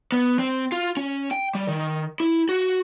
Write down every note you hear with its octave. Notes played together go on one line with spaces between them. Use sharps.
B3
C4
F4
C#4
G5
G3
D#3
E4
F#4